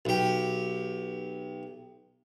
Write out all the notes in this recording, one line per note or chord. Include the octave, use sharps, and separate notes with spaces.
B1 G4